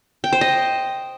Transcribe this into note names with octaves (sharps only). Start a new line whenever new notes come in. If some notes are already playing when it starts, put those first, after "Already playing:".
G5
C5
D#5